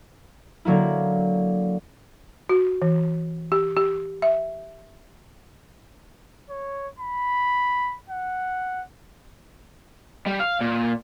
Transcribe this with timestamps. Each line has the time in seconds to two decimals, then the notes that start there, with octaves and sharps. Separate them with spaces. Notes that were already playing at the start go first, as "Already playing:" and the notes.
0.65 D3 F#3 A#3 E4
2.49 F#4
2.82 E3
3.52 G4
3.77 G4
4.22 E5
6.50 C#5
6.99 B5
8.10 F#5
10.26 G3
10.40 F5
10.61 A#2